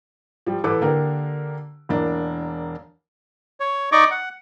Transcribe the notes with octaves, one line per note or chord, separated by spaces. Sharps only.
F3 G3
A1 A4 B4 D6
D3 A#3 D4 G4 A#4
E1 A#3 D4
C#5
D#4 D5 D#5 C#6 D6
F#5